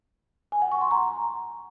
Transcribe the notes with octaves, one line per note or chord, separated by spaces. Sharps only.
G#5
F#5
C#6
C6
A#5